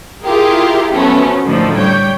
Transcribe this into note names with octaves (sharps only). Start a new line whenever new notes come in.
E4 F4 G4 G#4 A#4
F3 F#3 A3 B3 C#4
A2 D3 D#3 F3 F#3 A3
G3 C#5 G5 G6